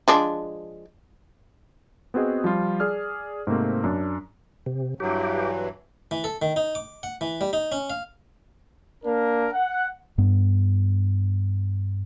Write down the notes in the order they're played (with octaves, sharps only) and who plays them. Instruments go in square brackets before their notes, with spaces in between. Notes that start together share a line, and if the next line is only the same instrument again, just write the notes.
[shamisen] F3 G#3 D4
[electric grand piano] B3 C4 F#4 G#4 D#5
F3 G3 F4
G#4 D5 F6
G#2 C3 A3 A#3 C4
F#2 D4
[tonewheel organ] C3
[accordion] G2 E3 F#3 [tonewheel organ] G4
[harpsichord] E3
A4
D#3
D#4
D6
F#5
E3
G3
D#4
C#4
F5
[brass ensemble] A#3 D4 A#4
F#5
[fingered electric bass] G2 B3